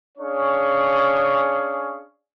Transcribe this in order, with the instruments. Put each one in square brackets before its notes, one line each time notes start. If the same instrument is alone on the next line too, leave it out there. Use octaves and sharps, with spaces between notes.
[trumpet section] C#4 D4 G#4 C#5 F5 C#6